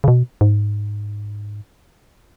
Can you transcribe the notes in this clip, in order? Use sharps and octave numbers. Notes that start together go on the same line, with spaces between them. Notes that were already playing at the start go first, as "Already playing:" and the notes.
C#3
B2
G#2